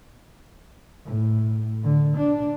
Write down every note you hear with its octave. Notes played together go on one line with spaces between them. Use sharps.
A2
D3
D4